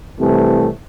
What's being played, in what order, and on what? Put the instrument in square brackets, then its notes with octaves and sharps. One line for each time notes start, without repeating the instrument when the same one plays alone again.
[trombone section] C2 C3 E3 A3 C4